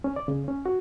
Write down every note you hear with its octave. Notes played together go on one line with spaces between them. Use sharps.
C#4
D5
C#3
C#4
F#4